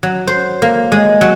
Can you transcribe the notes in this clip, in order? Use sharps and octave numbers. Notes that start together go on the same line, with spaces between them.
F#3
C5
A#3
G#3
F#3